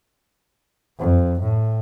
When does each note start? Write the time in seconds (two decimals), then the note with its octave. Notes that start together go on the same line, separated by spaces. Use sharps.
0.99 F2
1.40 A2